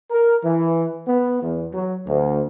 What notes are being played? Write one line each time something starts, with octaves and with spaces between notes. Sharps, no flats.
A#4
E3
B3
E2
F#3
D2